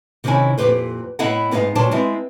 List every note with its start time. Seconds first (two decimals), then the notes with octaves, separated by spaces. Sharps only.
0.24 C3 D#3 C#4 D#4 E4 G#5
0.58 F2 A#2 C#3 G4 B4 C5
1.19 A2 B3 E4 D#5 F5 F#5
1.51 G#2 B3 D#4 C5 F5
1.75 A#2 F#3 D4 C5 A5
1.91 G#3 B3 C4 E4